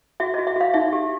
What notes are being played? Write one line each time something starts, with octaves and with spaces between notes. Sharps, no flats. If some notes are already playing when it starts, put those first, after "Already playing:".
F#4 E5
F#4 D#5
E5
F#4 F5
D#4 E5
G4